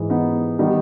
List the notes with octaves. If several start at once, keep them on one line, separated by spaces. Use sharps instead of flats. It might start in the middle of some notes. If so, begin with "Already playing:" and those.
Already playing: G#2 E3 G#3
B3 D#4
D#3 G3 B3 D#4